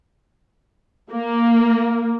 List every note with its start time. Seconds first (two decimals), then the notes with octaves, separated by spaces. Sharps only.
1.11 A#3